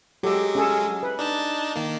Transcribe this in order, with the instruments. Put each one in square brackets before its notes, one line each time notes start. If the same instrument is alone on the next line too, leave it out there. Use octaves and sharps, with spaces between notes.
[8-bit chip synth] F#3 G#3 [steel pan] G4 A4
[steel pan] C#4 G#4 A4
B4
[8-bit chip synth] D4 D#4 A5
D#3 A#3